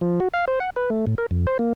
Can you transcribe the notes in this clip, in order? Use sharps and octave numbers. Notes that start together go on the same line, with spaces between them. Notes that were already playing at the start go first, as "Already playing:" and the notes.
F3
F#4
F5
C5
F#5
B4
A3
A2
A#4
F2
C5
A#3